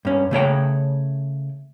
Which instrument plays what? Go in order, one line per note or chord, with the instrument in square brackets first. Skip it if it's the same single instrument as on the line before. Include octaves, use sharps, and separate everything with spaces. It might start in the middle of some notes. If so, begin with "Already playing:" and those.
[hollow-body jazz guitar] G2 C#4
C#3 A3 C#5 G5